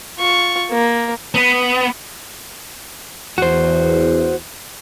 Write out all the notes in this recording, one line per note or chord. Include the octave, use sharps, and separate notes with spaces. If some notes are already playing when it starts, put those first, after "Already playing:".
F4 C#6
A#3
B3
E2 F#4 C5